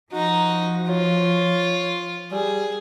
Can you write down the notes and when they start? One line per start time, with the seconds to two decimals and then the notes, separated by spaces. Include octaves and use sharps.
0.13 F3 D#4 F#4 A#5
0.89 F4 C#5
2.32 G3 G#4